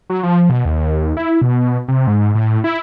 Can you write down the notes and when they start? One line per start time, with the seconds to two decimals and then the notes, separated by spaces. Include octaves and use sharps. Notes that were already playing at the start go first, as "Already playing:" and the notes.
0.10 F#3
0.23 F3
0.50 B2
0.65 D#2
1.17 E4
1.42 B2
1.88 C3
2.07 G#2
2.35 A2
2.64 E4